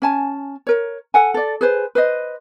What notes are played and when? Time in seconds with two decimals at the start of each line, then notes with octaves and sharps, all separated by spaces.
0.02 C#4 G#5 A5
0.67 A#4 C#5
1.14 A4 F#5 G#5
1.34 A4 D5
1.61 G#4 B4 C5
1.95 B4 C5 D#5